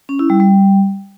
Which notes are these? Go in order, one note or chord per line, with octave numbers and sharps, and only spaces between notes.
C#4
E4
G3
G3